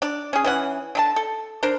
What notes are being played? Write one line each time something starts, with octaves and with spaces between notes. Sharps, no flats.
D4 D5
C#4 G#4
E3 C#4 F#5
D3 A3 A5
A4
D4 A#4 C5